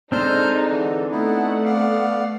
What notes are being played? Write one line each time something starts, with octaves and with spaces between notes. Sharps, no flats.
G#3 C4 D4 D#4 A4 C5 F6 G6
D3 E3
A3 B3 D#4 E4 F#5
B3 D5 F5